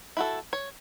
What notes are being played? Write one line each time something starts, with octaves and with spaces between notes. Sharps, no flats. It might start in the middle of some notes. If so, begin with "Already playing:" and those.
E4 F#4 A4
C#5